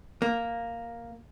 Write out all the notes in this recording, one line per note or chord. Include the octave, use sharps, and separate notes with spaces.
A#3